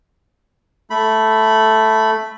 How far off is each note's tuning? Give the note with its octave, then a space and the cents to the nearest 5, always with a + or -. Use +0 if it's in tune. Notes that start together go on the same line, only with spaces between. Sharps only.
A3 +0 B5 +0